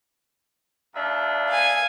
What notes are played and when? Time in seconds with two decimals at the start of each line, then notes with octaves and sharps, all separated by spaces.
0.95 D#2 D4 E5
1.49 F5 G#5